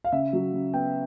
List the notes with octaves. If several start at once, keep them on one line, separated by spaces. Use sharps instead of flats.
F5
C#3 E5
F#3
C#3
B3 G5